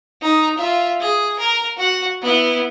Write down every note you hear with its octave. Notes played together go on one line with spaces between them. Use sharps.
D#4
F4 E5
G#4
A#4
F#4 F#5
B3 E4